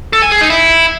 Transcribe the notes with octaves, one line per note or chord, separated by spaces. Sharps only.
A4
G#5
G#4
D#4
E4